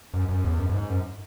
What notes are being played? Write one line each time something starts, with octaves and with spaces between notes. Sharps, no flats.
F#2
F#2
E2
F#2
F#2
G#2
F#2